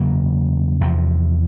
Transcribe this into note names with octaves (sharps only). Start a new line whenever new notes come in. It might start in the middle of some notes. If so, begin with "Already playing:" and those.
Already playing: E2 C#3 F#3 A#3
E2 C3 F3